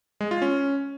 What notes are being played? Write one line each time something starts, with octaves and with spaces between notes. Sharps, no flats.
G#3
F4
C#4